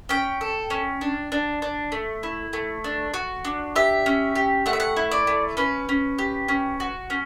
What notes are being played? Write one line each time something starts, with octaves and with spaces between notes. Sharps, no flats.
C#4 G5
A4
C#4
D4
D4
D4
A3
E4
A3
D4
F#4
D4
G4 E5
C#4
G4
A3 F#5
E5
F#5
E4
D5
A3
C#4 B4
C#4
G4
C#4
F#4
C#4